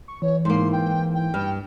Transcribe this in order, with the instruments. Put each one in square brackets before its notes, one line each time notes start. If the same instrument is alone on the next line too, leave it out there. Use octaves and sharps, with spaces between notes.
[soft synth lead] C#6
[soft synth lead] E3 [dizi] C#5
[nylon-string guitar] G#2 A#3 [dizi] C6
[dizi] G5
G5
[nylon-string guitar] G2 [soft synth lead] F6